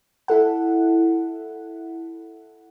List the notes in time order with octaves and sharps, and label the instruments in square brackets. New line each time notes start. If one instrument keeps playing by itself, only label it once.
[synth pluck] E4 A4 F#5